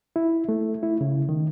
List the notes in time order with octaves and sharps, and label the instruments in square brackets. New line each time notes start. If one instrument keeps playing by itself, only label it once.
[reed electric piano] E4
A3
E4
C#3
D#3